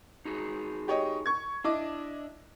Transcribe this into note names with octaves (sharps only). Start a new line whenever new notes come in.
D#4 F#4 G#4
G4 C#5 D#5
C#6 G#6
D4 E4 D#5 D6